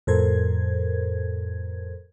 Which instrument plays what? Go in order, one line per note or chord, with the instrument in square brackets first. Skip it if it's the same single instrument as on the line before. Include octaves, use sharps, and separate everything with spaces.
[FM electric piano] F2 A2 A4 A#4 C5 G#6